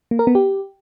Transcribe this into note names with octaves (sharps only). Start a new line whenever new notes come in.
A#3
A#4
B3
G4